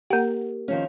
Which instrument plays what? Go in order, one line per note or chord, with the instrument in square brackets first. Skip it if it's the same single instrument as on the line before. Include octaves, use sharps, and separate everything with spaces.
[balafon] A#3 F#5 [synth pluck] G4 A#4
[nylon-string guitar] D#3 F3 C#4